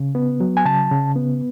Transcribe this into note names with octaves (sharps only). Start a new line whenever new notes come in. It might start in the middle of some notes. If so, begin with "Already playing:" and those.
Already playing: C#3
B3
F#3
G#5
C#3 A5
C#3
B3